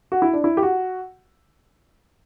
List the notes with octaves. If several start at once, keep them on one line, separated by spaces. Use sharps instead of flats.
F#4
E4
D4
E4
G4
F#4